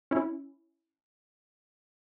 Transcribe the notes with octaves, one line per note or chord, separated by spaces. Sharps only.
C#4 E4